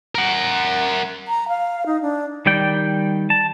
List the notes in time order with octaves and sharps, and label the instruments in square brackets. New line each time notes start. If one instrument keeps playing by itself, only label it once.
[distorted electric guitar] A#4 F#5
[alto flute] A#5
F5
D#4
D4
[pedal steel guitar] D#3 G3 D5 G5
A5